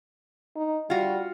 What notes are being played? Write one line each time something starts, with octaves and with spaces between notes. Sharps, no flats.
D#4
G3 F4 F#4